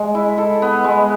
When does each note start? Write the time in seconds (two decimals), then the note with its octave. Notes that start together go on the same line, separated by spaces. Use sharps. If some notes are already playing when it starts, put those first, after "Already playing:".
Already playing: G#3
0.15 E4
0.38 A4
0.62 B3
0.84 G#3